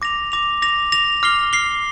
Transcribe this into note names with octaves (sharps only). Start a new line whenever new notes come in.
D6 A#6 F7
D6 A#6 F7
D6 A#6 F7
D6 A#6 F7
D6 F6 C7 G7
D6 F6 C7 G7